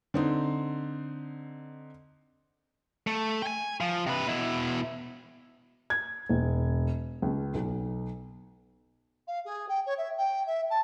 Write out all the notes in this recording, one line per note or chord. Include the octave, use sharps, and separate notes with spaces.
D3 C4 D#4
A3
G5 G#5
F3
C3 B4
B2 E4
G#6
E1
C#2
B1
F5
G#4
G5
C#5
E5
G5
E5
A5